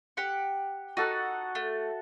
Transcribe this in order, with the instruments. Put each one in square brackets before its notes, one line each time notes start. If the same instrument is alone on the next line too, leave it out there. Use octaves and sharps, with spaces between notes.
[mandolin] G4 F#5
[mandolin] D#4 [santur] F#4 A4 F#5
[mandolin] A3